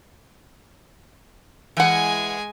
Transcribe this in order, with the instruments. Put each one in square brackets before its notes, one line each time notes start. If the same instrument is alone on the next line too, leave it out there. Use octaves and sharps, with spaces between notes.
[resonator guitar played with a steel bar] E3 F#5 [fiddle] G#3 G#5